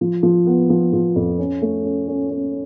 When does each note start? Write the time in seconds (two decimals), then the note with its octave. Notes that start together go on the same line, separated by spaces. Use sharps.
0.01 F3
0.23 F3
0.46 B3
0.70 F3
0.93 F3
1.16 F2
1.39 C#4
1.62 A3
1.85 C#4
2.08 C#4
2.30 C#4